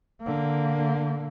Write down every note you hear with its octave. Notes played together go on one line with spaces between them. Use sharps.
D3 A#3